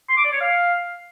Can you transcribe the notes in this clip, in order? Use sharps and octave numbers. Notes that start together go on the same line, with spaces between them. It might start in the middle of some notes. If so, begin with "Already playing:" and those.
C6
D6
D5
C#5
F5